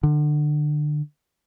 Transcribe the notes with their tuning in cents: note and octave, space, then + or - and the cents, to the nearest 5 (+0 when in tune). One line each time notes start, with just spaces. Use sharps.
D3 +25